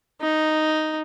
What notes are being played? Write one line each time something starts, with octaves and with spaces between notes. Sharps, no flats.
D#4